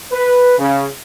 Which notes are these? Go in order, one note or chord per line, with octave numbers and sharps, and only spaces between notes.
B4
C#3